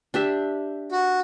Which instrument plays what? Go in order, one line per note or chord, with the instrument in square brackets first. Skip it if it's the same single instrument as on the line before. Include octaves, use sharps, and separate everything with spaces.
[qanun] D4 G4 E5
[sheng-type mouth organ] F#4